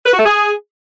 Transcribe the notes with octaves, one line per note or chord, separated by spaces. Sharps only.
B4
F#4
A3
G#4